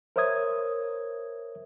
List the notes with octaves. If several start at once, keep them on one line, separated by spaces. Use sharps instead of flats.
A#4 C5 C#5 E5 D#6 G#6